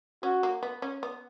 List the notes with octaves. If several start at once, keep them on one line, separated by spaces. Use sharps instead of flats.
C#4 F#4
A#3
B3
C#4
B3